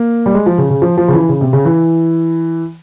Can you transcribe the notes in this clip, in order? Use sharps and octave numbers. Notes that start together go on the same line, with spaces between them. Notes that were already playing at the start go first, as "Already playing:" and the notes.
Already playing: A#3
G3
G#3
F3
C#3
C#3
F3
F3
C#3
E3
C#3
C3
C#3
E3